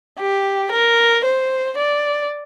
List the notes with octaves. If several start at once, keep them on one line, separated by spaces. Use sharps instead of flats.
G4
A#4
C5
D5